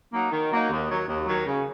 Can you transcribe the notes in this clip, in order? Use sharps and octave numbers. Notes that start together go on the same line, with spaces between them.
F#3 A#3 D#4
D#3
F#3 A#3 D#4
D#2
D#3 F#3
D#2
D#3 F#3
C#3